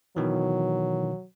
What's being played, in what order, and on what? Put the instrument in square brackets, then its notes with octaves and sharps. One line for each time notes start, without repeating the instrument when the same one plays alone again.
[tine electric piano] B2 D#3 E3 [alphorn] F#3